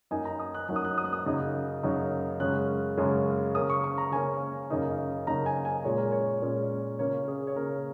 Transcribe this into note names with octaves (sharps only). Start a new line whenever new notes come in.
F#2 F#3 A#3 D#4 G#5
A#5
D#6
F#6
F#2 F#3 A#3 D#4 F#6
D#6
F#6
D#6
F#6
D#6
F#2 C#3 F#3 D#4
F#2 C#3 F#3 D#4
F#2 C#3 G#3 C#4 F#6
F#2 C#3 G#3 C#4
C#3 A#3 C#4 D#6
C#6
C#6
A#5
C#3 A#3 C#4 G#5
F#2 C#3 A#3 D#4
F#2 C#3 A#3 D#4 A#5
G#5
G#5
A#2 G#3 C#4 C#5
A#4
C#5
A#2 G#3 C#4
C#3 A#3 C#4 C#5
G#4
C#5
C#3 A#3 C#4 A#4